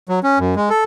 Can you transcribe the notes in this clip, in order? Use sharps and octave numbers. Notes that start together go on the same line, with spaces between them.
F#3
C#4
F#2
G#3
A4